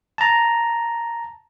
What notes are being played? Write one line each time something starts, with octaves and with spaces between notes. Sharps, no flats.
A5 A#5